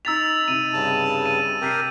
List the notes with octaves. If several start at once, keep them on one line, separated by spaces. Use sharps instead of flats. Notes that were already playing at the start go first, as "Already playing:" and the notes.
D#4 A#5 E6 A6 B6 F7
C3 D#4 D#7
G2 C#3 A5
D#7
C3 G4 A#4 B6 C7